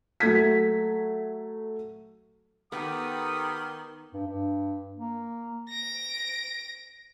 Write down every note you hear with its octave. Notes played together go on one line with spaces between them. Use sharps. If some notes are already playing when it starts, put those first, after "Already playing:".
F#3 A3 G#6 B6
D#3 B3 G4 A4 A#4 F#5 B5 D#6
G2
G2
A#3
A#6 D7